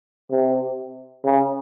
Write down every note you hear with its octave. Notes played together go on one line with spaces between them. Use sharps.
C3
C#3